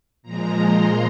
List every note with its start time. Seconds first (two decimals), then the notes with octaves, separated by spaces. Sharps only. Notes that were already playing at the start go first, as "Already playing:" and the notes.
0.22 A#2 F3 G#3 A#5
0.59 C6